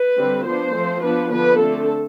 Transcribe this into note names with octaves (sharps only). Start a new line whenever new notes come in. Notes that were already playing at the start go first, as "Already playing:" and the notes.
Already playing: B4
D3 G3 C4
F3 B3 D4 C5
F3 A3 C4
F3 B3 D4 B4
D3 F3 B3 D4 B4
D3 A3 C4 A4